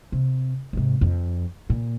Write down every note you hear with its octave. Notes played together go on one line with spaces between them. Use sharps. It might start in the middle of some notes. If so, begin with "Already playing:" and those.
C3
G#2 C3
F2
A#2